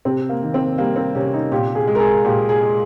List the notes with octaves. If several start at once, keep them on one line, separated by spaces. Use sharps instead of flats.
C3 C4
A#3
D#3
C4
G3 A#3
C4
C3 C#4
D#4
A#2 G4
G#4
G#3
A#4
G#4
A#2 G4
G#4
G#3